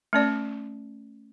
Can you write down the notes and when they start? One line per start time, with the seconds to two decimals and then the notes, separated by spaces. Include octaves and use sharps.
0.13 A3 C#4 D5